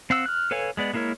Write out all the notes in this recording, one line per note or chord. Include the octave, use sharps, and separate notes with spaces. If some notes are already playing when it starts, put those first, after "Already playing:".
C4 F5 F#5 E6
F6 F#6
A4 B4 C#5 F5 G#5
G#3 B3 D5
G#3 A#3 E4 A#4 C#5